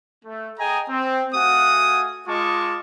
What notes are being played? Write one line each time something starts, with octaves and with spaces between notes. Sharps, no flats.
A3
G#4 D#5 G5 G#5 A#5
C4
A3 F#4 F5 F#5 G#5 D#6
G#3 F4 D#5 A5 C#6 D6